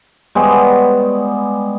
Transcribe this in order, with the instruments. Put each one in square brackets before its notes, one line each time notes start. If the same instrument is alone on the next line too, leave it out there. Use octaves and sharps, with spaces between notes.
[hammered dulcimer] G3 G#3 B3 C#5